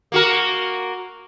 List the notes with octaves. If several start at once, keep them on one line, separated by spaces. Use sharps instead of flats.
A#3 F#4 A#4